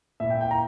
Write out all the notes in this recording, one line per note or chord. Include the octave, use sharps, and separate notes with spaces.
A#2 A#3 E4 E5
G5
G5
A#5